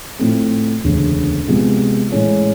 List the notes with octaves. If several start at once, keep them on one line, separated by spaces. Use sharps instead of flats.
A2 F3 A3 C4
E1 D2 C#3
C3 F3 G#3 B3
A2 E3 G#3 C#4